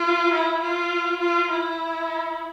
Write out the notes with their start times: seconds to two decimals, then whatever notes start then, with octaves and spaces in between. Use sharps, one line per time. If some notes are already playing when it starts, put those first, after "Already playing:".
Already playing: F4
0.33 E4
0.63 F4
1.21 F4
1.51 E4